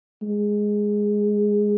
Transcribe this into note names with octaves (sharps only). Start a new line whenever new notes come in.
G#3